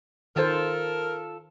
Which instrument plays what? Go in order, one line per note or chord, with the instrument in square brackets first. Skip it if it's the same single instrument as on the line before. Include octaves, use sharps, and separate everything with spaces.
[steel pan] D#3 C5 [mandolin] F4 A4 A5 [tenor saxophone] A#4